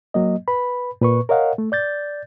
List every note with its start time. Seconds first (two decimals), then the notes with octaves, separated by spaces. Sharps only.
0.14 F#3 A#3 D#5
0.48 B4 B5
1.01 A#2 B4 C#6
1.29 A#4 C#5 D#5 F5 F#5
1.58 A3
1.72 D5 G6 A6